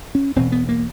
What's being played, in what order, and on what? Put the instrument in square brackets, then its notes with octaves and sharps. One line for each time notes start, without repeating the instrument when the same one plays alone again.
[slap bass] C#4
E1 E2 B2 C4
B3
A#3